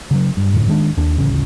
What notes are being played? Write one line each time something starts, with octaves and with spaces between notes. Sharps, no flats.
C#3 E3 F#3
G2
F1 F#2 A2 D3
D#3 G#3 D4
D#2 D4
D#1 A1 D2 C#3